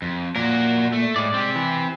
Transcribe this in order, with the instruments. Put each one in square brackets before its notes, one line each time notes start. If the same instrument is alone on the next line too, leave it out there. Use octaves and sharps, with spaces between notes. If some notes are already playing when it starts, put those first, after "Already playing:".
[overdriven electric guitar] F2
[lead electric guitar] A#2 [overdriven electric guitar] F#4 A#4
[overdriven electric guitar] A3
[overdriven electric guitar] A2 [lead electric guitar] G#3 D5
[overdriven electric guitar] C4 G4
[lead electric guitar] E3